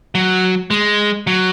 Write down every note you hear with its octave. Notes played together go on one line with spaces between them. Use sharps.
F#3
G#3
F#3